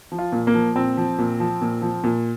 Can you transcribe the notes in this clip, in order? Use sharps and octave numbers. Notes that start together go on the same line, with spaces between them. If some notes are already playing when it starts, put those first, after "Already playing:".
F3
F4
A#2
A#3
F3
A#2 C4
F3
A#2
F3
A#2
F3
A#2